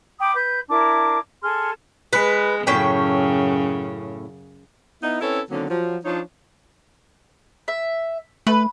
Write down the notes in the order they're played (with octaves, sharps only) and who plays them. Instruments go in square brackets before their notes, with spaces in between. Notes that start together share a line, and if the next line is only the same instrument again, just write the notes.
[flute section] G5 B5 D6 D#6
B4 G6
D4 E4 A#4 D6
G#4 A4 C6 F6
[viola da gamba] G#3 [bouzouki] B4
[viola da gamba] F#2 C#3 [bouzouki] A2 C#4 G5
[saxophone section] B3 D#4 E4
C4 C#4 E4 A4 B4 C#5
D3 D#3 F#3 A#3 C4 C#4
F3 F#3
F3 D4 D#4 F4 C#5
[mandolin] E5
[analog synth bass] A3 [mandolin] B4